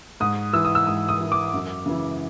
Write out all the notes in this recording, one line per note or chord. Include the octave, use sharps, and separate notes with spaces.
G#2 D#6
E3 E6
D#6
E6
G#2 D#6
D#6
E3
D6
F#2
C#3 E3